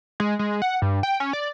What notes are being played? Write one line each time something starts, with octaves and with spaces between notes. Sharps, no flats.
G#3
G#3
F#5
G2
G5
C#4
D5